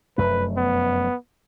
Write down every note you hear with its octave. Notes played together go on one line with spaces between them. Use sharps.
F1 F#2 A3 B4
B3